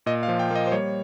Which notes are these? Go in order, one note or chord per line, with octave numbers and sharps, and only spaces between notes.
A#2 D#5
F5
F3
G5
A#3 D#5
C5
G3 C#5